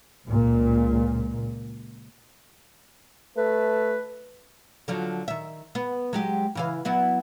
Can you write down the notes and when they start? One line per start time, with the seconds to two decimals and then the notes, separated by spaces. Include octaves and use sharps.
0.25 C#2 A#2
3.37 A3 B4
4.88 D3 F3 F#3
5.28 D#3 E5
5.75 B3
6.13 F#3 G#3 G4
6.55 C#3 E3 F5
6.85 F#3 B3 E4